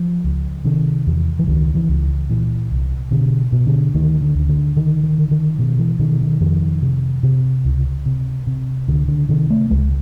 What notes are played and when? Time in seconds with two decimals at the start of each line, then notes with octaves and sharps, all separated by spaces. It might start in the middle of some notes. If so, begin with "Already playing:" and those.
Already playing: F3
0.24 C#2
0.65 C3 D#3
1.07 E2
1.39 E3
1.47 C#2 D#3
1.75 E3
1.88 C#2
2.29 A#2 E3
2.71 C2
3.11 B2 D3
3.52 B2
3.67 D3
3.94 D2 D#3
4.21 D3
4.35 D2
4.49 D3
4.76 D3 D#3
5.03 D#3
5.18 D3
5.31 D#3
5.59 B2 D#3
5.79 E3
5.99 B2 D#3
6.21 D#3
6.41 F2 D#3
6.82 C3
7.23 C3
7.65 C#2
8.06 C3
8.47 C3
8.88 C#2 D3
9.08 D3
9.29 C3 D#3
9.50 A3
9.70 C#2 G#3